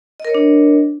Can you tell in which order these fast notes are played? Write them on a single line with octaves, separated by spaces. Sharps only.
D#5 A#4 C#5 D4